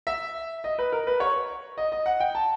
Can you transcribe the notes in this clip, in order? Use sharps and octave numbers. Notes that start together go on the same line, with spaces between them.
E5
D#5
B4
A#4
B4
C#5
D#5
D#5
F#5
G5
A5